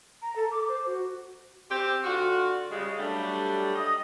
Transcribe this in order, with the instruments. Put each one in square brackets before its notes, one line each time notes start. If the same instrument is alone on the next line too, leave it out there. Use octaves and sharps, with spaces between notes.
[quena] A#5
A4
D6
C5
F#4
[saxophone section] C4 G4
D3 F4 F#4
C#3 G3 G#3
F#3 G3 A3 D4 G4
D#5